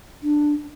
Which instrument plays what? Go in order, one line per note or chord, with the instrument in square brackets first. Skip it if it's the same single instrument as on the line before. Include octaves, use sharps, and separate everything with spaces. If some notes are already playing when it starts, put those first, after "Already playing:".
[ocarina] D4